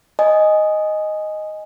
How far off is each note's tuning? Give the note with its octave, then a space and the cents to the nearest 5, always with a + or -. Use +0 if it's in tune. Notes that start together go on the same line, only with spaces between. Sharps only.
D#5 +0 G#5 +0